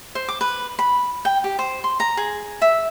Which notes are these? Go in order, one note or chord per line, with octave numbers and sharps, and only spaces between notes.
C5
D6
B4
B5
G5
G4
C5
C6
A#5
G#4
E5